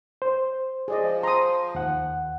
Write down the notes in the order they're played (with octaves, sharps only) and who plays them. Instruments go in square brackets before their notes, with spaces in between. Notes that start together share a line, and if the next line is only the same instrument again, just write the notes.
[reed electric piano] C5
[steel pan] G#4 D5 D#5
[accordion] F3
[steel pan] A#5 D#6 [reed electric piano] C6
[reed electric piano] D#2 F#5